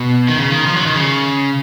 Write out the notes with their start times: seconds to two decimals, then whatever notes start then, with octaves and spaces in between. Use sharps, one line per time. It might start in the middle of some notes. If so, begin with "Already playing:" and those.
Already playing: B2
0.28 D#3
0.37 C#3
0.52 D#3
0.66 F3
0.76 F#3
0.86 D#3
0.96 C#3